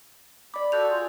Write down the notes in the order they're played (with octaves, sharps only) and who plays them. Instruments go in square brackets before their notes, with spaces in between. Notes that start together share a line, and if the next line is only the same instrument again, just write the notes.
[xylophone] D5 D6 [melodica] B5
[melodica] F#4 A4 D5 [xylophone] F#6 G6 F7
[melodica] F4 G#4